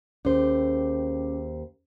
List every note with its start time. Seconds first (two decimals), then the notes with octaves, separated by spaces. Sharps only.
0.25 D#2 C#4 G#4 C5